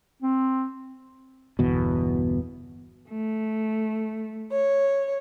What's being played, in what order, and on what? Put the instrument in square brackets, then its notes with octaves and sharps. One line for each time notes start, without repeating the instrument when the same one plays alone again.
[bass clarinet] C4
[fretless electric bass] G1 E2 B2
[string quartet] A3
C#5